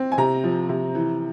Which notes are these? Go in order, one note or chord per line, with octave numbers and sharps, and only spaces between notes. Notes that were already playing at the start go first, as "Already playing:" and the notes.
Already playing: C4
G#5
C3 A#5
F3
C3
E3